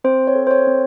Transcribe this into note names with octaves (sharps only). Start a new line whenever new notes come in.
C4 C5
C#5
A4
C5
C#5
C4